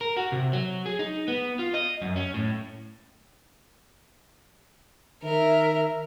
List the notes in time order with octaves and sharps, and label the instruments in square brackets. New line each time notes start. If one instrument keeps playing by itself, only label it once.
[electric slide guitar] A#4
F#4
C3
F#3
G#4
D#4
B3
F4
D#5
F#2
C#4
A2
[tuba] D#3 [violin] A#4 [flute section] E5